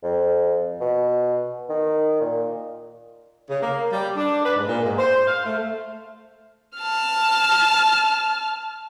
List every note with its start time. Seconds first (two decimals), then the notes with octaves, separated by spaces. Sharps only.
0.03 F2
0.80 B2
1.70 D#3
2.21 A#2
3.49 C#3
3.62 A#3
3.92 G3
4.16 D4
4.44 B4
4.56 G#2
4.67 A#2
4.84 G#2
4.99 C5
5.27 F5
5.45 A3
6.78 A5 F6